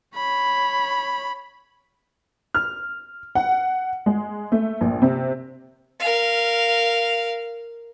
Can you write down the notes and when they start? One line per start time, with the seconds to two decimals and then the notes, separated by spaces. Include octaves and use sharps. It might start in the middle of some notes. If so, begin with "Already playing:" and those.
0.15 C#5 B5
2.54 F6
3.35 F#5
4.06 G#3
4.52 A3
4.81 A#1
5.02 C3
6.00 A#4 F5